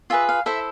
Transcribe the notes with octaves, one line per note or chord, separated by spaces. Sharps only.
F4 G#4 B4 E5
F5
E4 A4 C5 E5